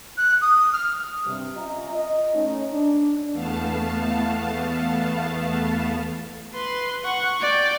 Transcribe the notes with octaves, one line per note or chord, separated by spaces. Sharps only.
F#6
D#6
F6
G2 C3
C#4 F4 D#5 E5 A#5
D#5
A3 C#4 D#4
D4
E2 A3 B3 F5 A5
B4 C6
F#5 C#6
D5 G5